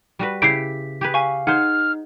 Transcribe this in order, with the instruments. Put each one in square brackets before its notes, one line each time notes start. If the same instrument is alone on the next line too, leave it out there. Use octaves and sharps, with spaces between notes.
[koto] G3 F#4 B4
[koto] C#3 E4 G4 [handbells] B6 [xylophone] C7 D7
[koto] G4 G#4 B4
[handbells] F5 [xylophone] G#5 C#6
[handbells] D#4 [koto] G#4 C5 [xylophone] F#5 [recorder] F6